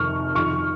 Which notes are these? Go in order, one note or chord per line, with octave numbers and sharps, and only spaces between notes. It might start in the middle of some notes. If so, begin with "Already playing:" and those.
Already playing: F2 C3 D#3 C#6 F6
F2 D#3 C#6 F6